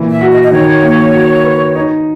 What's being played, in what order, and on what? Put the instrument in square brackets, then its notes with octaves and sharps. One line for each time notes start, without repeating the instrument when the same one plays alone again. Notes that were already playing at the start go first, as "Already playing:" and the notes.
Already playing: [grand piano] A#2 E3
[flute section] E5
[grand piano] F#4
[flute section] D#5
D#5
[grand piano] D#3 [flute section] C#5
[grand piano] A#3
F#4
B4
D#4